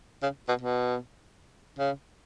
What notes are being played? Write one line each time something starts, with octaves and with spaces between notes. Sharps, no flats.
C#3
B2
B2
C#3